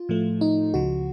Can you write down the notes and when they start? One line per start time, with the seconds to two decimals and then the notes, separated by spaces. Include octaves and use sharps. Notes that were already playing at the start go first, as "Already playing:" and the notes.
Already playing: F4
0.09 A2 F3 A3
0.41 D#4
0.74 C#2 C#3 F3 F#4